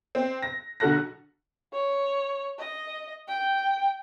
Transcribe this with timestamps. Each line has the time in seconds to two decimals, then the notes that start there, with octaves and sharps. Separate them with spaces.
0.15 C4
0.42 A#6
0.80 B1 D3 F#4 A4 F#6 A#6
1.73 C#5
2.59 D#5
3.28 G5